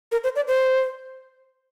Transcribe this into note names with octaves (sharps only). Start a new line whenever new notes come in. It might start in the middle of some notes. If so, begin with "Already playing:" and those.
A#4
C5
D5
C5